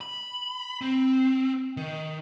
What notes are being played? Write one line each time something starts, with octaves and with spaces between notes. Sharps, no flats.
B5
C4
D#3